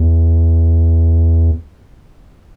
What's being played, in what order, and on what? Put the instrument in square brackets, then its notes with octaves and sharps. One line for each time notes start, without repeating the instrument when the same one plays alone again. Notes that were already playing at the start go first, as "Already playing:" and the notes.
Already playing: [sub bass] E2